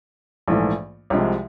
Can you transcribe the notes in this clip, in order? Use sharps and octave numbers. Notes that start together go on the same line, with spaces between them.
A#1 G#2 E3 A3
C2 C3 F3 G#3